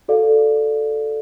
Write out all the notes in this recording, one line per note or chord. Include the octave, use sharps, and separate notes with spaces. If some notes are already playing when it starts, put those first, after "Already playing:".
F#4 A4 D5 F5